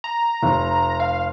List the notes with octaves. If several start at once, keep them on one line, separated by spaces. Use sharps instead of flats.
A#5
F1
F5